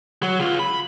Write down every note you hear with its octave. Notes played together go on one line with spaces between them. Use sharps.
F#3
C#3 F4
B5